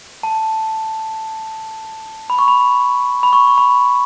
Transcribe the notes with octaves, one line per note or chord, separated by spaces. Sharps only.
A5
B5
C#6
B5
B5
C#6
C#6
B5